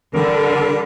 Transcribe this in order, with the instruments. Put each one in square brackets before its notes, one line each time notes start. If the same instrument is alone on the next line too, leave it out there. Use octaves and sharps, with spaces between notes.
[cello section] D3 [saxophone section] G3 A#4